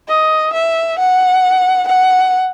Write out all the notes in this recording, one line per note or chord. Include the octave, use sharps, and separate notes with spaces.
D#5
E5
F#5
F#5